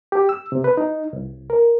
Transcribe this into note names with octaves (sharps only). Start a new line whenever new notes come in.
G4
E6
C3
B4
D#4
C2
A#4